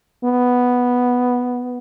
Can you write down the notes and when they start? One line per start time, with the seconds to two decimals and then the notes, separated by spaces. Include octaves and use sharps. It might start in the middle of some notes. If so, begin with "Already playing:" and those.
0.24 B3